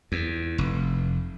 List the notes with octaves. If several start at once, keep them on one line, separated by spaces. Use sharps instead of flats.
E2
F1